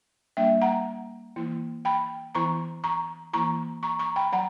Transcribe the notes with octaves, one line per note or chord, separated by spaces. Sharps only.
G3 A#3 D4 E5 G5
F#5 A#5
E3 A#3 E4
G5 B5
E3 B3 E4 A#5 C#6
A#5 C#6
E3 A#3 E4 A#5 C#6
A#5 C#6
A#5 C#6
G5 B5
F#3 F#5 A#5